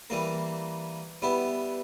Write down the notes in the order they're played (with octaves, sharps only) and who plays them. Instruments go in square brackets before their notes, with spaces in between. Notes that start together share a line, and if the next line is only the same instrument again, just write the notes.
[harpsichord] E3 G3 A#3
G3 B3 E4